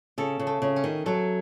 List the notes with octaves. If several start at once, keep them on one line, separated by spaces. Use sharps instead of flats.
C#3 A4
C#3
A3
C#3
C#4
D#3
F#3 A3